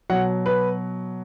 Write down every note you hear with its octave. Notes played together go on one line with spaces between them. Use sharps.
B2 F#3 F#5
B4